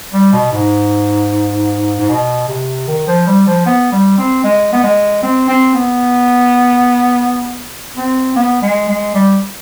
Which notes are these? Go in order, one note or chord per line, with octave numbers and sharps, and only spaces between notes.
G3
B2
G#2
G#2
B2
C3
D#3
F3
G3
F3
B3
G3
C4
G#3
B3
G#3
C4
C4
B3
C4
B3
G#3
G#3
G3